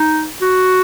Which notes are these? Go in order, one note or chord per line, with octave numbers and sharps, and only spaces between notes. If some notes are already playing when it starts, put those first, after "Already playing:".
Already playing: D#4
F#4